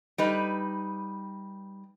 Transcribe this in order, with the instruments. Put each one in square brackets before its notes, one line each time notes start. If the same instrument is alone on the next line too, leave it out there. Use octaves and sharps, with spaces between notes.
[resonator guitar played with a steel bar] G3 D#4 B4